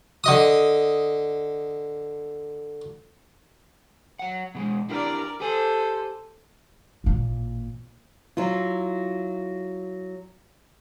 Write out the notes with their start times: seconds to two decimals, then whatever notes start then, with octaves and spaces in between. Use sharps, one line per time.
0.24 D3 D#5 D#6
4.19 F#3 F#5
4.55 B2 G3 G#3
4.90 D4 E4 G4 A#4 D5
5.40 G4 A4 C5 G#5
7.04 A1 A#2
8.37 F#3 E4 F4